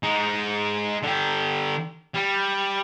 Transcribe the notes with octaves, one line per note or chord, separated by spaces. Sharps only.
G#3 D#4
D3 G4
G3